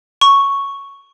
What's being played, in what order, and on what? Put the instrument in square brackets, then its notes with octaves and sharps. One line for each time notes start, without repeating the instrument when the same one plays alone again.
[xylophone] C#6